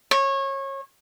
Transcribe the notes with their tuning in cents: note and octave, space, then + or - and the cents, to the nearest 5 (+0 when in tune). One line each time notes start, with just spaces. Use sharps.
C#5 -25